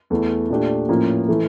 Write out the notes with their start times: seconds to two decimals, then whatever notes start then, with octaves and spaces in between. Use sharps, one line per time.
0.10 E2 E3 A3
0.49 A#2 A3 D4 G4
0.88 A2 F3 A#3 C#4
1.28 E3 A3